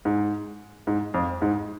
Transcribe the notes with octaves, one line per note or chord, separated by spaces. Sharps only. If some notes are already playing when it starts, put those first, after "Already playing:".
G#2
G#2
F2
G#2